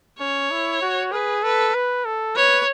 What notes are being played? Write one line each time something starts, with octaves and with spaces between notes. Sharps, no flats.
C#4 C#5
E4
F#4
G#4 B4
A4 B4
B4
A4
B4 C#5